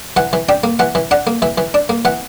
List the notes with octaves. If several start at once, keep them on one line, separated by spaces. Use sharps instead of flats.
E3 F#5
E3
D4 G5
A#3
E3 F#5
E3
D4 F#5
A#3
E3 E5
E3
D4
A#3
E3 F#5